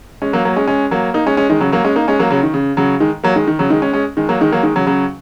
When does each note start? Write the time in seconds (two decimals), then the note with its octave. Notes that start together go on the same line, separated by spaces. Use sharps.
0.22 G#3 C#4
0.33 F#3 A#3
0.45 F#3 A#3
0.56 G#3 C#4
0.68 G#3 C#4
0.91 F#3 A#3
1.14 A#3 D#4
1.26 G#3 C#4
1.37 G#3 C#4
1.49 D#3 G#3
1.61 C#3 F#3
1.72 F#3 A#3
1.84 G#3 C#4
1.96 A#3 D#4
2.08 G#3 C#4
2.19 F#3 A#3
2.30 C#3 F#3
2.43 D#3
2.54 C#3
2.77 C#3 F#3
3.00 D#3 G#3
3.24 F#3 A#3
3.36 D#3 G#3
3.47 D#3
3.59 C#3 F#3
3.70 D#3 G#3
3.82 G#3 C#4
3.93 G#3 C#4
4.17 D#3 G#3
4.29 F#3 A#3
4.40 D#3 G#3
4.52 F#3 A#3
4.63 D#3 G#3
4.76 C#3 F#3
4.86 C#3 F#3